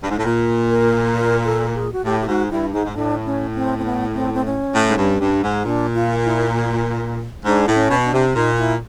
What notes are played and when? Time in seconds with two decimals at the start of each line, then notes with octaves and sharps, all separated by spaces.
0.03 G2
0.10 G#2
0.18 A2
0.25 A#2
0.70 A#4
1.16 A#4
1.45 A4
1.75 G#4
1.93 F#4
2.05 A2 G4
2.21 G4
2.28 G#2 F#4
2.50 G2 E4
2.72 G#2 D#4
2.85 G#2
2.95 A2 D4
3.26 C#4
3.56 C4
3.78 C4
3.85 B3
4.14 C4
4.34 C4
4.46 C#4
4.75 A2
4.89 G#2
4.97 G2
5.20 G2
5.42 G#2
5.64 A#2 D4
5.94 F4
6.25 E4
7.45 G#2 D4
7.67 A2
7.75 C#4
7.90 B2
8.05 D4
8.13 C3
8.35 A#2 D#4
8.58 E4